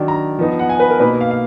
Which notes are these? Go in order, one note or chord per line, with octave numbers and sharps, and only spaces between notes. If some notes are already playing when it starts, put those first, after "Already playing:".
Already playing: D#3 F#3 D4
A#5
F3 B3 D#4
F#5
G#5
B4
A#4
B2 A#3 D#4 B4
F5
F5